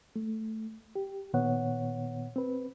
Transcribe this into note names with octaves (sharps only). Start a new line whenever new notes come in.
A3
G4
A#2 D#3 B3 C#5 F#5
C4 B4